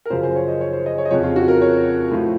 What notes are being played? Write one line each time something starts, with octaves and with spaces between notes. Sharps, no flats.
A#4
F#2 C#3 F3 C5
C5
C#5
D#5
C#5
C5
D#5
C#5
D#5
F2 C#3 F3 C#5
F4
F#4
A#4
C#5
A2 F3